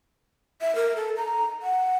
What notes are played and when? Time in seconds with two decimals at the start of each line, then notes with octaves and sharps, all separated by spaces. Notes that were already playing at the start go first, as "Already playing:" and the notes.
0.61 E5
0.75 A#4
0.96 A4
1.17 A#5
1.62 F#5